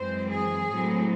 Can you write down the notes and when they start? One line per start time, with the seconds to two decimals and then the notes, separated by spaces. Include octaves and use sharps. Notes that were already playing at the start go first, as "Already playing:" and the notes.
Already playing: F#2 E3 G#3 C4 C5
0.30 G#4
0.70 A2 F#3 C4